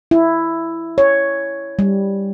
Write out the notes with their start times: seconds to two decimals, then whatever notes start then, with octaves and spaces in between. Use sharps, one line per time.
0.11 E4
0.98 C#5
1.79 G3